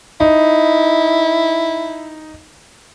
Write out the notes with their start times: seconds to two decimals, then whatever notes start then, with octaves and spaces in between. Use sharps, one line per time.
0.21 D#4 E4